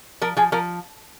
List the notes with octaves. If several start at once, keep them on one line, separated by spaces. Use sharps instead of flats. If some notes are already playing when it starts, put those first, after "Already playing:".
F3 A#4
F3 G#4
F3 A#4